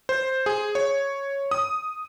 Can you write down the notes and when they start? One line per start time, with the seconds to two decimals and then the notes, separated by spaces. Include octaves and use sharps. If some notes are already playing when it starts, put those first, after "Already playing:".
0.09 C5
0.46 G#4
0.75 C#5
1.51 D#6